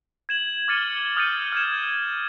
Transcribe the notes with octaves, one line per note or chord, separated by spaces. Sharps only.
G#6 E7 F#7
D6 F6 A6 C#7 D#7 G7
D#6 F6 G6 A6 C#7 D#7
F6 G#6 E7